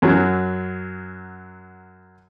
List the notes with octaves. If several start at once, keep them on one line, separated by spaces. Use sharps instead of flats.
F#2 F#3